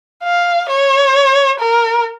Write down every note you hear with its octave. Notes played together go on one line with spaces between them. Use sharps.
F5
C#5
A#4